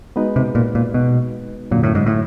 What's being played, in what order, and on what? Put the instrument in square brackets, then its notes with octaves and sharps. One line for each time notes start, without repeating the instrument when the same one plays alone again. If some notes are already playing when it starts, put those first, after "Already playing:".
[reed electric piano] G#3 B3 D#4 F#4 B4
[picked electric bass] C3
A#2
A#2
B2
[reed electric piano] F#2 D3 F#3 [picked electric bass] A#2
[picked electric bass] A2
G#2
A2